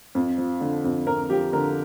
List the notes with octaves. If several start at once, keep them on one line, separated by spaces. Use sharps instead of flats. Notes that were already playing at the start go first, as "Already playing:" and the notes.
F2
F3
D3
F2
F2 A#4
F3 G4
D3 A#4